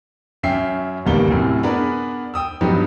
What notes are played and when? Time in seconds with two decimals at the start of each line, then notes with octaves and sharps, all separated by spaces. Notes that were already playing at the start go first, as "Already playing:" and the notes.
0.43 F#2 C#4 E5 G5 C7
1.05 D1 A1 D#2 G3 A#3 G7
1.30 F#2 A2 C3
1.63 B3 D4 G#4 A#4 B4
2.34 G5 D#6 E6
2.61 G2 F3 F#3 B3 D#4 G4